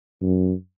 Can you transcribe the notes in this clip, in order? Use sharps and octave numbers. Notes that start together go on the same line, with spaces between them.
F#2